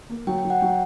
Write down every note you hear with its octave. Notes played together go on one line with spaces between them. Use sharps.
A#3
F#3 G5
G5
F#3
F#5
F#3 G5